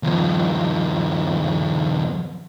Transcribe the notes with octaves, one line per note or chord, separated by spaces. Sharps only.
D#2 F3